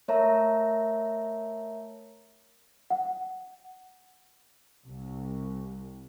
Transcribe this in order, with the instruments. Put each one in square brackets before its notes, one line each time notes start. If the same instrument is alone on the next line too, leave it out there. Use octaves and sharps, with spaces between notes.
[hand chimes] A3 A#4 C#5 E5 A5 A#5
[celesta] F#5
[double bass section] C2